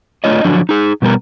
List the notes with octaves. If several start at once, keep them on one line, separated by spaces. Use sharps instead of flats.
A3 D4 F4 C#5 D#5
D3 F3 F#3 D4
D#4 G#4
B2 G3 B3 A#4